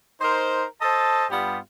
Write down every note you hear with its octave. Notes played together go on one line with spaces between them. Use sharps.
D#4 A#4 C5
A4 C5 D#5 A5
G2 G3 B3 F4 G4